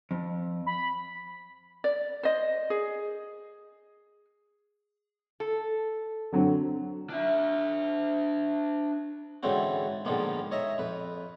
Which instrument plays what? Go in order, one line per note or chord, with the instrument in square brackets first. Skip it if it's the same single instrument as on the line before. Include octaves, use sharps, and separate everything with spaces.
[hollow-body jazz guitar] F2
[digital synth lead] B5
[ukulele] D5
C5 D#5
G#4
[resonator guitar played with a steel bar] A4
[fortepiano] D3 F#3 C4
[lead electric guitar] D4 E5
[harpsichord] G#2 D3 E3 C4 C#4 F#4
G#2 D3 D#3 F3 A#3 B3
C#5 D#5 E5 A#5
F2 B4